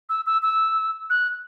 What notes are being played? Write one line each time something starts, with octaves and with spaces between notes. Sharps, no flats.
E6
E6
E6
F#6